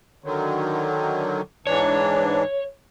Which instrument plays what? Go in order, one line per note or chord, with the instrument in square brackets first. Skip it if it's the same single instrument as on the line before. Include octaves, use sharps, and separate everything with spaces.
[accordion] D3 D#3 F#3
[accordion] G#2 E3 D4 [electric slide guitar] C#5